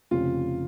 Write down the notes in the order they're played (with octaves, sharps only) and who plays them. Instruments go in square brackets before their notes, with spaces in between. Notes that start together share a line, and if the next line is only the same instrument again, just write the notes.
[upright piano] F1 F2 C#3 F4